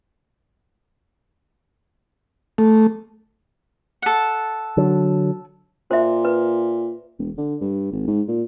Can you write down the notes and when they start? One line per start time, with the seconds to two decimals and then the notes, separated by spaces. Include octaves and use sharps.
2.58 A3
4.02 A4 F#5
4.77 D3 F#3
5.91 A#2 C5 E5
6.25 B4
7.19 E1
7.38 D3
7.61 G2
7.92 G#1
8.08 G#2
8.28 A#2